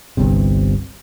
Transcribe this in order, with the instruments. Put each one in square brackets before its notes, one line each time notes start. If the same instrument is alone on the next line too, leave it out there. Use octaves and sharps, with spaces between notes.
[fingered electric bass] G1 C2 C3